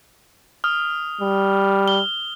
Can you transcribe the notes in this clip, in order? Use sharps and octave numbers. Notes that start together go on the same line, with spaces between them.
D#6 F6
G3
G7